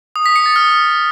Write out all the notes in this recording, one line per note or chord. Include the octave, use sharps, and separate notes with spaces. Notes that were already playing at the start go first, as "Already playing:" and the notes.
D#6
B6
C#7
A6
F6